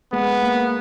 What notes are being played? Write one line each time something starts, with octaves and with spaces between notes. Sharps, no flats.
G#3 B3
A#3